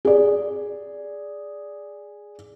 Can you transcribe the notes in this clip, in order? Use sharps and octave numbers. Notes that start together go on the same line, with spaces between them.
G#4 D5